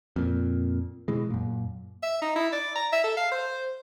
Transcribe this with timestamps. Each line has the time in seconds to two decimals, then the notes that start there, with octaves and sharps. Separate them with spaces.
0.16 F2 A#2
1.08 B2 E3 G#3
1.30 F#2 A#2
2.03 E5
2.22 D#4
2.36 E4
2.52 D5
2.75 A#5
2.93 E5
3.04 A4
3.17 F5
3.31 C5